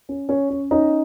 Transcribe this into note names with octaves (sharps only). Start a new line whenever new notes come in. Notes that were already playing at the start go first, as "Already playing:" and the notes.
C#4
C#4 C#5
C#4
C#4 D#4 D#5